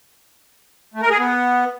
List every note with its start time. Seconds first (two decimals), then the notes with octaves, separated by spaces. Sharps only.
0.94 A3
1.02 A#4
1.10 G#4
1.19 B3